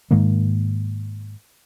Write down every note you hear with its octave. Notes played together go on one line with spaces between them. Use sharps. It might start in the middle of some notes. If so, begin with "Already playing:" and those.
G#2 D#3 G#3 A#3